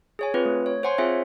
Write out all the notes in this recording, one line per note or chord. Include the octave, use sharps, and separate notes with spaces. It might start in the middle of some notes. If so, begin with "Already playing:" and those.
G#4 C#5 G#5
C4 F4 B4
A3
C#5
C5 C#5 F#5 G#5 C6
C4 F4 G#4 C5 E5 G#5